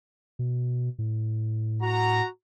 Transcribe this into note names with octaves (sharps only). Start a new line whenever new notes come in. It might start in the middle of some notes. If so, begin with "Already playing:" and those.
B2
A2
F#4 A#5